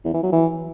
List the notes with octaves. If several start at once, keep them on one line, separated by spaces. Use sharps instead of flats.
E2
E3
F#3
E3